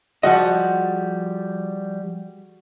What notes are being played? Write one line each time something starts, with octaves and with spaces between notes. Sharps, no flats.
F3 G3 F#4 G#4 D#5 F#5